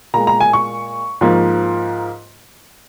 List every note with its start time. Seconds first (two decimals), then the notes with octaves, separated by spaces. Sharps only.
0.14 A#2 G#3 A#5
0.27 A#5
0.40 G#5
0.53 C#6
1.21 G#2 F3 A#3